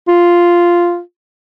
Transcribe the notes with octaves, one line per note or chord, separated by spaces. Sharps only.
F4